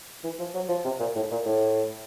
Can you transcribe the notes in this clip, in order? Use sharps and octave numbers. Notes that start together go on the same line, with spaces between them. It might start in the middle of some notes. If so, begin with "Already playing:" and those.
E3
F3
F#3
F3
C3
A#2
A2
A#2
A2